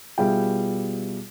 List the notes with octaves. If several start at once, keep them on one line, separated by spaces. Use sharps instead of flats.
B2 G3 F4 G#4 E5 G5